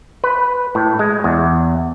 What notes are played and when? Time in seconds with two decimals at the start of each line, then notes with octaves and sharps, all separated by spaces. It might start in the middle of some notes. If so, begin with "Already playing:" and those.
0.24 B4
0.75 A2
0.99 G#3
1.24 E2